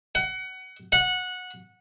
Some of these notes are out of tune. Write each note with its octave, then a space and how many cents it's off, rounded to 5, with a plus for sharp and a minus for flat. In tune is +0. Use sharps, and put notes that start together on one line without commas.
F#5 +25
F#5 -15